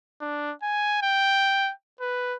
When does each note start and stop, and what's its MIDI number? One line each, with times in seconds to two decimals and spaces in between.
0.21 0.52 62
0.63 0.99 80
1.02 1.71 79
2.01 2.36 71